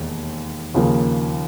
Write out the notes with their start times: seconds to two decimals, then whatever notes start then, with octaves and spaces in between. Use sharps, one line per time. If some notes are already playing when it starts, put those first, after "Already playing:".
Already playing: E1 D#2
0.74 D#2 C#3 F3 A#3